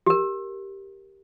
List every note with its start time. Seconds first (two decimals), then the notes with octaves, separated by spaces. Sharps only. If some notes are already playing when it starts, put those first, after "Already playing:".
0.06 G4 A#4